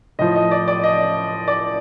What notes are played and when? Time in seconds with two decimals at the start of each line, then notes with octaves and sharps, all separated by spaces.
0.19 A2 F3 D#5
0.36 D#5
0.51 D5
0.68 D5
0.84 D#5
1.48 D5